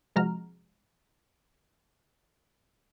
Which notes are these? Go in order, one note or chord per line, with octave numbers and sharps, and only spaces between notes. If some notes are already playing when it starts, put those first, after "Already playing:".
C3 F3 G#3 F#4 A#5 F6